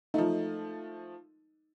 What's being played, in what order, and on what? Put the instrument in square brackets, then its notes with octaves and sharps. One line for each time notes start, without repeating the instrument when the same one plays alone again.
[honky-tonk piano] F3 A3 [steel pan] D#4